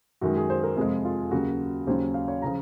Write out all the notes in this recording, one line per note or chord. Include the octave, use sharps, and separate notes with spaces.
F#2 D#3 G#3 F#4
G#4
C5
A#4
F2 C3 F3 G#3 G#4
F4
D#2 C#3 F#3 A#3 F#4
D#2 C#3 F#3 C#4 C5
F5
C#5
C#3 F3 A#5